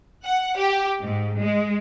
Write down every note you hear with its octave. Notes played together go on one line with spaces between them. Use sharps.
F#5
G4
G#2
G#3